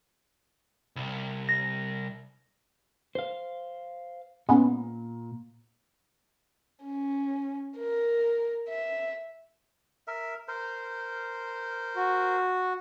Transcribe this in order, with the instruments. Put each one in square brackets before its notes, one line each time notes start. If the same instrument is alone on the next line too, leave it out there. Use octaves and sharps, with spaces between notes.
[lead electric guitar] C2
[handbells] A#6
[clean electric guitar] C5 F5
[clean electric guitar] A#2 [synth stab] G#3 B3 C#4
[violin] C#4
A#4
E5
[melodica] A#4 E5
A#4 C5
[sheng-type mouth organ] F#4